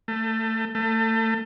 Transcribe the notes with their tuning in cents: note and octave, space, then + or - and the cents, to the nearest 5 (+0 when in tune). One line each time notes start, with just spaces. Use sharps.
A3 +25
A3 +30